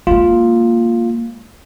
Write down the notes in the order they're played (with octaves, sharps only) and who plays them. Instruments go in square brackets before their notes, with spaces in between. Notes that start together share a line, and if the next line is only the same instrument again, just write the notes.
[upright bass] G#3 A#3 [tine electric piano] F4